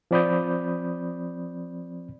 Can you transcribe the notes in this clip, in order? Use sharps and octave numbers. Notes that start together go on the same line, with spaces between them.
F3 C4 D5 B5 D#6 G6